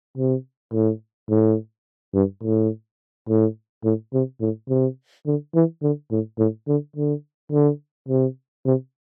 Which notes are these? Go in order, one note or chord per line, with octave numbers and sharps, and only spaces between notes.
C3
A2
A2
G2
A2
A2
A2
C3
A2
C3
D3
E3
D3
A2
A2
D3
D3
D3
C3
C3